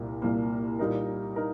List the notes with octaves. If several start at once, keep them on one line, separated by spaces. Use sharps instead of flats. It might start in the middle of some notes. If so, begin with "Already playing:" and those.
Already playing: C2 A#2 A#3
C2 A#2 A#3
A#2 G3 D#4 A#4
D#4 A#4